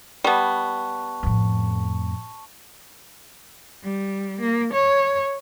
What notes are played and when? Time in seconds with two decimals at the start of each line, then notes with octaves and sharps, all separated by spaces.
0.24 G3 B3 A5 C#6
1.23 F2 A2
3.83 G3
4.40 A#3
4.74 C#5